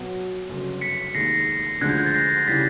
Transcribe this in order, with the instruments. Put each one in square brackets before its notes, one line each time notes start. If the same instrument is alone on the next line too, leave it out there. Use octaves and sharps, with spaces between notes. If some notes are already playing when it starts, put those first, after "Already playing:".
Already playing: [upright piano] B2 F#3 B3
G1 F#2 C#3 F#3
[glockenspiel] B6 C#7
[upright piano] F1 D#2 D#3 G#3 [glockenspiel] A#6 C7
[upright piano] D2 D3 F3 G#3 [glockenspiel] F#6 G#6
[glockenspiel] G6
F#6 G#6
G6 A6
A#6 C7
[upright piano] C#3 E3 G3 [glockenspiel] A6 B6